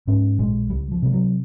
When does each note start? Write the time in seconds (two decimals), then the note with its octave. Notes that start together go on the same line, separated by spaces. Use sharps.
0.07 G#2 C#4
0.39 A#1 G#3
0.70 C#2 G3
0.92 F3
1.02 C3 G3
1.13 F#3